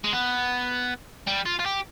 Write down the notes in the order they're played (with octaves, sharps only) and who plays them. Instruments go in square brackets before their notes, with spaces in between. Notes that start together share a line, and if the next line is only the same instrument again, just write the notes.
[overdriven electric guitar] G#3
B3
G3
F4
F4
G4